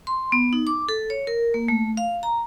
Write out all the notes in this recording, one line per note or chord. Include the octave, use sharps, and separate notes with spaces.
C6
B3
D#4
D6
A4
C#5
A#4
A#3
A3
F5
A#5